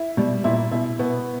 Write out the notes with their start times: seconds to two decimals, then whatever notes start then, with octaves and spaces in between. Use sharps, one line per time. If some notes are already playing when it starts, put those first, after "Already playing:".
Already playing: E4
0.17 B2 G3
0.44 A#2 E4
0.72 B2 E4
0.99 B2 B3